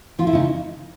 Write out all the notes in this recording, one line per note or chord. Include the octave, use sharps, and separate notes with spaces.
F3 F4
E4
C#3 D#4